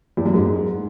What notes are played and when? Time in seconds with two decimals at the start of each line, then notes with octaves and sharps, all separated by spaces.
0.17 E2
0.26 F#2
0.34 G#2